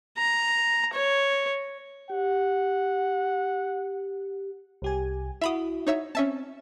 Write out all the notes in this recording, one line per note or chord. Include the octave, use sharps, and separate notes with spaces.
A#5
C#5
G4 F#5
C2 G4 G#5
E4 F#4 E5 B5 D#6
D#4 C#5 E5
C4 C#4 E5 A5